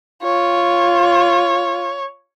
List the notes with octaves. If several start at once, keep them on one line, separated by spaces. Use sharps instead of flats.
F4 C#5